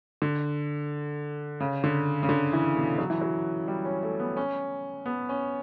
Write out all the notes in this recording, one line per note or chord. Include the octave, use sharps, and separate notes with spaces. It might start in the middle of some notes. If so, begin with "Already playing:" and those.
D3
C#3
D3
C#3
D3
E3
B2
F#3
E3
F#3
G3
C#4
A3
B3
C#4
B3
C#4